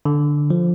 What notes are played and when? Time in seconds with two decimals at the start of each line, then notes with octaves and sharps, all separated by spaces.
0.05 D3
0.50 F3